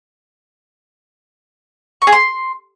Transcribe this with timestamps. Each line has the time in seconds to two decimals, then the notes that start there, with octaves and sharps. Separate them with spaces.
2.02 C#6
2.07 G#4
2.12 C6